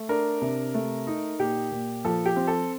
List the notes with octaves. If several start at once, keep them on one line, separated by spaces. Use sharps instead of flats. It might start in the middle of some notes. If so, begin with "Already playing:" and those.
Already playing: A3
D4 A#4
C3
A3
D#4
A#2 G4
A#2
F3 A4
G4
C4
A4